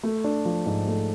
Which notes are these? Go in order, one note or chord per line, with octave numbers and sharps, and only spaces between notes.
A3
D4
F3
G#2
A3